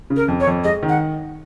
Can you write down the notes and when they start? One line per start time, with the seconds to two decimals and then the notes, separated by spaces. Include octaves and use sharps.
0.10 C#3
0.17 A#4
0.28 F2
0.40 C#5
0.47 F2
0.64 G#3 D#5
0.83 D#3
0.89 F#5